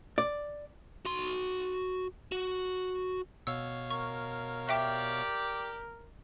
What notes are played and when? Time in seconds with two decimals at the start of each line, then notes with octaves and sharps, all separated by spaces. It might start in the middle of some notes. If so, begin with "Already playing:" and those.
0.18 D5
1.05 F#4 C6
2.32 F#4
3.47 B2 C#5 F5 E6
3.90 A#4 C#6
4.69 G4 D5 E5 G5 D6